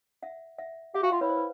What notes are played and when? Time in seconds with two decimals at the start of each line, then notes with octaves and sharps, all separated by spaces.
0.23 E5 F#5
0.58 E5 F#5
0.94 G4 E5 F#5
1.03 F#4 F5 G5
1.12 F4 E5 F#5
1.21 E4 B4 C#5
1.29 C5
1.37 B4